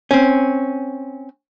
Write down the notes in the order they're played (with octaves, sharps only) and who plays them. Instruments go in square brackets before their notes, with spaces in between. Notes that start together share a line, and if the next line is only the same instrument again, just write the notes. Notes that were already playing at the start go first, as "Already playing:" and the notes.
[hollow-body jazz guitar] C4 C#4